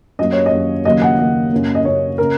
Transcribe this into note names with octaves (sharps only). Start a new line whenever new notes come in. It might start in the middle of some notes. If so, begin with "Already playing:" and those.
F#2 F#3 A#3 D#5
C#5
D#5
F#2 F#3 A#3
D#2 C#3 F#3 A#3 D#5
F#5
D#2 C#3 F#3 A#3 D#5
F#2 C#3 A#3
D#5
F#2 C#3 A#3 C#5
C#3 A#3 A#4